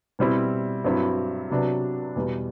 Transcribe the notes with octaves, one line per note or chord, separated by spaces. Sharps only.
B2 G3 C4 E4
G2 F#3 C4 E4
C3 F#3 B3 D4
E2 B2 G3